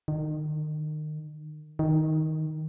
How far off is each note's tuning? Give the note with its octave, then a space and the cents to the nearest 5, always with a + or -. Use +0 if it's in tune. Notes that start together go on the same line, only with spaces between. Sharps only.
D#3 -30
D#3 +10